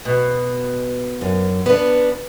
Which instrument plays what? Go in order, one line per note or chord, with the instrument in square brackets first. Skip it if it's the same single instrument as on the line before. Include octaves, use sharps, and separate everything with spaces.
[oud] B2
[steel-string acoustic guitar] F#2
[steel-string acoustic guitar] B3 D4 [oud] B4